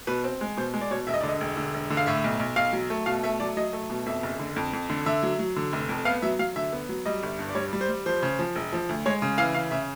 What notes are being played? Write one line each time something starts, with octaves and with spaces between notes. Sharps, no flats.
B2 B4
C4
G#3
B2 C5
G#3
D5
B2 C#5
E1 E5
D#5
D5
D3
D#5
E1
D3
E1
D3
F5
A2 E5
B1
B1
B1 F5
F#3
A3
B2 F5
A3 E5
F#3 D5
F#3 D#5
A3
B2
F2 E5
F#1
D3
F2
F2
D3
D3 E5
F#3
F#3
D3
F1
F2
B3 F5
F#3 E5
F#3 F5
D3 E5
B3
F#3
G3 D#5
G1
G2
D5
G3 C#5
G3
C5
G3
F3 C5
C#3
F3
E1
F3
D2
G#3 C#5
C#3
E3 F5
C#3 F5
C#3 E5